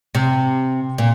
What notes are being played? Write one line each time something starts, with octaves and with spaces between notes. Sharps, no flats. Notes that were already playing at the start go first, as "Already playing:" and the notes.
C3
A#2